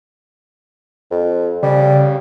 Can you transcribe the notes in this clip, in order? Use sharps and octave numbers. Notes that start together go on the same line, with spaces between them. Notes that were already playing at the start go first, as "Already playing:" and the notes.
F2
C#3 G3